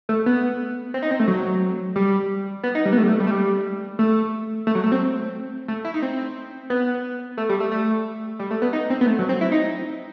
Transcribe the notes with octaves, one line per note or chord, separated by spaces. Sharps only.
A3
B3
C4
D#4
C4
A3
F#3
G3
B3
D#4
G3
B3
A3
G3
A3
G3
A3
G3
A3
A3
F#3
A3
C4
A3
E4
D#4
C4
B3
A3
G3
A3
A3
G3
A3
B3
D#4
C4
B3
A3
F#3
C4
E4
D#4